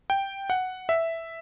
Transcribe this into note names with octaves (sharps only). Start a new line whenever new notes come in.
G5
F#5
E5